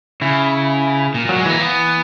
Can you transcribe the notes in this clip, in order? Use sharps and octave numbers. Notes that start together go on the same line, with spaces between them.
C#3 E4
A#2
A#2 F#3
G#3
E3 A#3
E3 B3